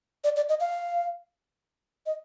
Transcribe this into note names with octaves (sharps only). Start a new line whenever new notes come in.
D5
D5
D#5
F5
D#5